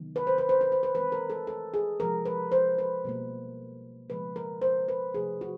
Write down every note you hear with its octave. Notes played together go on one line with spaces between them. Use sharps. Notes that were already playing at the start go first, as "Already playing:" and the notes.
Already playing: C3 D#3 F#3 B3
B4
C5
B4
C5
B4
C5
B4
E3 G#3 C4 B4
A#4
A4
A4
G#4
C3 F3 G#3 A#4
B4
C5
B4
B2 G3 A#3
C#3 F3 G#3 B3 B4
A#4
C5
B4
C3 F3 A3 G#4
F#4